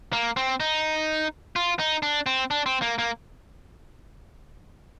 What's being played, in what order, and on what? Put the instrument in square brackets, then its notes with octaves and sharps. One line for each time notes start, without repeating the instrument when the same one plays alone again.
[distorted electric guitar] A#3
C4
D#4
F4
D#4
D4
C4
D4
C4
A#3
A#3